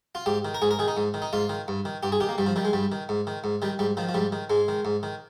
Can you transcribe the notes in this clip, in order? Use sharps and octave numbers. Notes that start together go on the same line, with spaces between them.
F4
G#2 G4
D#3
A#4
G#2 G#4
A#4
D#3 G#4
D#4
G#2
D#3
D#4
G#2 F4
D#3
G2
D#3
G2 G4
G#4
D#3 G4
A#3
G2 G3
F3
D#3 G3
G#3
G2 G3
D#3
G#2
D#3
G#2
D#3 G3
G#2 G3
D#3 F3
F3
G#2 G3
D#3
G#2 G#3
D#3
G#2
D#3